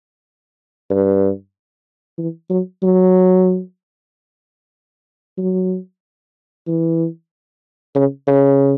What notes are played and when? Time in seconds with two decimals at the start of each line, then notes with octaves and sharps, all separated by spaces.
0.90 G2
2.18 E3
2.50 F#3
2.83 F#3
5.38 F#3
6.67 E3
7.95 C#3
8.27 C#3